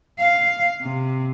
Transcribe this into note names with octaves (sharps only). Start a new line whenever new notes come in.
F5
C3